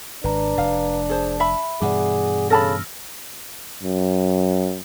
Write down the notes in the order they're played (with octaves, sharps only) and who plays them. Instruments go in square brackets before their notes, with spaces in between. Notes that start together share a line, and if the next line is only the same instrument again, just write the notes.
[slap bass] G#1 [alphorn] D4 [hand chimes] B4 A#5
[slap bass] F1 [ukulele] F5
[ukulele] G#4 C5 [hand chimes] A5
[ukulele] E5 B5
[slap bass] G2 B2 E3 [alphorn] G#4 [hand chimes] D5 F#5 D6
[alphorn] C#3 [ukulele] A4 A5 B5 [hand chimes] E6 F6 A#6
[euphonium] F#2